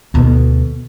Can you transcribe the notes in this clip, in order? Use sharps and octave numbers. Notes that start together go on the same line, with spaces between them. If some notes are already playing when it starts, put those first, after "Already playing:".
D2 B2